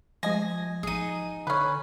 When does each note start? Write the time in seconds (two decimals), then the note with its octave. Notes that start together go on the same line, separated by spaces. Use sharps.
0.23 F3 G#3 D#5 G#5 A#6
0.83 A1 D#4 G#4 D#7
1.47 D3 C#4 B4